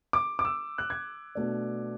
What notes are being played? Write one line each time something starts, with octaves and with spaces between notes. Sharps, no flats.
D6
D6
E6
F#6
G#6
B2 A3 D4